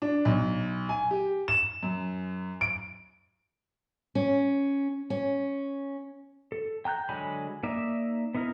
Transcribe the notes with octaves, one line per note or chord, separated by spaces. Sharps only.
D4
B1
G#5
G4
E7
F#2
D7
C#4
C#4
A4
G5 A#5 F#6 G6
D3 F#3 G#3 G#5 B5
A#3 D#4 D5 E5
B3 D#4 E4 A#4